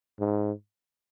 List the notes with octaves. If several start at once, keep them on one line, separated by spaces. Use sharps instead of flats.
G#2